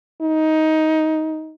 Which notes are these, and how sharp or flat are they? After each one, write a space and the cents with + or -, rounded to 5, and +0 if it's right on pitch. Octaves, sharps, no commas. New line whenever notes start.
D#4 +15